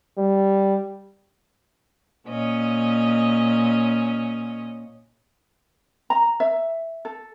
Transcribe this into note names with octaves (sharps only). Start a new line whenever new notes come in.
G3
A#2 C#4 D#5
A#5
E5
A4